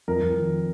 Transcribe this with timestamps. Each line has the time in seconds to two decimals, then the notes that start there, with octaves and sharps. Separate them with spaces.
0.08 F2 A#4
0.22 F2
0.37 D#3